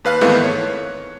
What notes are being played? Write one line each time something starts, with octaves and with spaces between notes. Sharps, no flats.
D#2 B4 F5 F#6
F2 G#2 D#3 E3 A3 B3
C#5